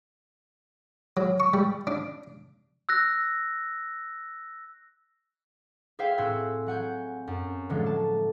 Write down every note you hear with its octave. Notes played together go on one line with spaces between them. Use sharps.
F#3
C#6
G3
D4
E6 F#6 A#6
G#4 C5 E5 F5 G5
A2 C4 F#4 G#5 C6 E6
F#3 F#5 G#5 G6
F#2
A2 D3 F3 F#3 G#3 A3
A5